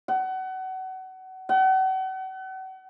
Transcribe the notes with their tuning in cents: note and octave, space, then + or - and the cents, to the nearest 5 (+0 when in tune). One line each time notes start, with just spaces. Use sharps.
F#5 +30
F#5 +40